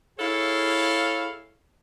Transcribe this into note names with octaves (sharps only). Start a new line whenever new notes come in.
E4 G#4 A4 C#5 F5